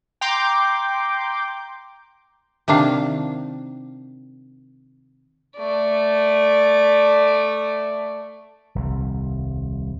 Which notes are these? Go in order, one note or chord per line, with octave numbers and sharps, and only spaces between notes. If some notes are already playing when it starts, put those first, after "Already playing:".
G5 A#5 C6 D6 G6
C3 D#3 D4 F5
A3 D5
D#1 C2